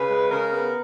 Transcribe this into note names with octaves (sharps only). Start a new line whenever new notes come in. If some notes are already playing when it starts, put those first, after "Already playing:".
Already playing: C#3 B4
G#3
C#3 A#4
B3